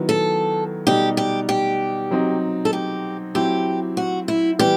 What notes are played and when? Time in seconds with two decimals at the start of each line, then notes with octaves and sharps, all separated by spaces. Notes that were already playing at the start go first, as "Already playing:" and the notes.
Already playing: D#3 F#3 B3 E4
0.09 A4
0.86 B2 G3 D#4 G4
1.17 G4
1.49 G4
2.11 F#3 C4 D#4
2.65 A4
2.73 G4
3.35 F#3 C4 E4 G4
3.97 F#4
4.28 E4
4.59 E3 G3 B3 G4